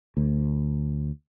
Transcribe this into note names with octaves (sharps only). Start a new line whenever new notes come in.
D2